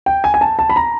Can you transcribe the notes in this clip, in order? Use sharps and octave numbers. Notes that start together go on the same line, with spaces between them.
G5
G#5
G#5
A5
A5
B5
A#5